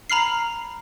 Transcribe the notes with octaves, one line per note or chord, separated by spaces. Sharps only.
A#5 B5 F6 C7